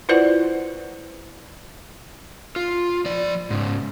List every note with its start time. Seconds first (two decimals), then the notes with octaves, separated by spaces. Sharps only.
0.09 E4 F4 B4 C5 D5 F#5
2.56 F4
3.06 F3 D5
3.50 G#2 C#3